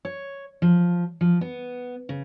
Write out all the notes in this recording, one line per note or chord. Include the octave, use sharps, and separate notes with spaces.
C#5
F3
F3
B3
C#3